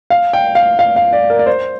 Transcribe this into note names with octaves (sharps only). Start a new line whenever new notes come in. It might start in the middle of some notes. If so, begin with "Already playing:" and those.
F5
G5
F5
F5
F5
D5
A#4
D5
C5